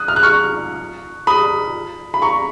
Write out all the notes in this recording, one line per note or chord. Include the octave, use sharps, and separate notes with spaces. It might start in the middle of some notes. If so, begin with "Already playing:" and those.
Already playing: D#6 F#6
F6
F#6
C#6 F6
B5 D#6
B5
A#5 C#6